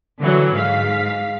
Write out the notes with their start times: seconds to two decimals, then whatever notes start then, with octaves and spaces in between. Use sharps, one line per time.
0.19 D3 E3 F#3
0.54 G#2 F5 B6